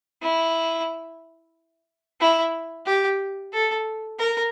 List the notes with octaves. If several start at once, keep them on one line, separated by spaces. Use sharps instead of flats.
E4
E4
G4
A4
A#4